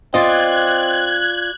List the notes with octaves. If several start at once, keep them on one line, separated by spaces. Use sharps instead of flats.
C4 F4 D5 D#5 F#6 G#6